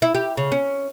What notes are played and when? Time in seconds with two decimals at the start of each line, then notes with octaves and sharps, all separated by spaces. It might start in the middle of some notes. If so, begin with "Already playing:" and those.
0.02 E4
0.15 G4
0.37 C#3
0.52 C#4